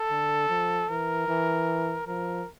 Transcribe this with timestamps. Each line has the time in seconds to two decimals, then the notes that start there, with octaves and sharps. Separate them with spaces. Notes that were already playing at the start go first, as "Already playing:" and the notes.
Already playing: A4
0.11 D3
0.49 F3
0.89 E3 A#4
1.28 E3
2.07 F3 A#4